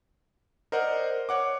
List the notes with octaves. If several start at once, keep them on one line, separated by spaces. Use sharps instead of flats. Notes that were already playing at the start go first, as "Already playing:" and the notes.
A#4 C5 D5 D#5 F#5
C#5 F#5 D6